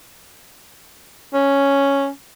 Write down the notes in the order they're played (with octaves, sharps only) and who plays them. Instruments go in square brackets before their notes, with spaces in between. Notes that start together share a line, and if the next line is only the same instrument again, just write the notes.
[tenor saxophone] C#4